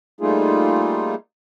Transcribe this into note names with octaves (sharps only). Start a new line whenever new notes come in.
G3 A3 A#3 D#4 F4 G#4